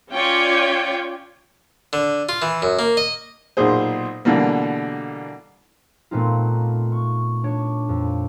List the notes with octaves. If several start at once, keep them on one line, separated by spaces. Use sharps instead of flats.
C#4 F4 C#5 D5 G5
D3
F4
E3
F#2
A#3
D#5
B1 A#2 G#4 C5
B2 D3 E3 G3 A#3
A#2 A3 B3 C4 D#4 F4
C#6
D4 C#5
F2